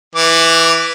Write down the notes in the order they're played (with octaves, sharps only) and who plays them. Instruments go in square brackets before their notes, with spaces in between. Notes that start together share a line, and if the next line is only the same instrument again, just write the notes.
[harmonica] E3 D6